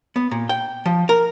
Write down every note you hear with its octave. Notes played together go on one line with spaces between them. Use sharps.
B3
A#2
G5
F3
A#4